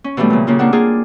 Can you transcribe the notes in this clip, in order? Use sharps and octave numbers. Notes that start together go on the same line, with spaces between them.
C#4
B2 E3 F#3 G3 A3
A#2 C#3
C#3 A#3 F4
A#3 C4 D4 F#5
A#3 F4 G#4 D5